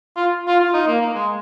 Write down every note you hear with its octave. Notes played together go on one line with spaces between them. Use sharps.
F4
F4
F4
D#4
A#3
A#3
G#3